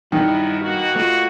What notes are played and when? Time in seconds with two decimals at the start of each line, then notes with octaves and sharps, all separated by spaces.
0.12 G2 B2 D#3 F#3 E4
0.61 B2 A#3 F#4
0.96 A3 F4